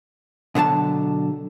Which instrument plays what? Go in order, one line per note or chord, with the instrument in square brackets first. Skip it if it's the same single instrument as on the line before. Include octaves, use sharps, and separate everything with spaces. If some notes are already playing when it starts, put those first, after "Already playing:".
[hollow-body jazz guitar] B2 D3 F#3 A5